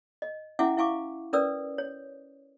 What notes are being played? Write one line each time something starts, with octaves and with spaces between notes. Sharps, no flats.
D#5
C#4 E4 E5 F#5 G#5 D6
E4 F5 G#5 C#6 D6
C#4 A#4 B4 D5 D#6 E6
C#5